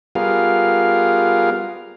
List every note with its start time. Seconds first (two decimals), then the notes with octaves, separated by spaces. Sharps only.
0.15 G3 B3 F4 G#4 A#4 F5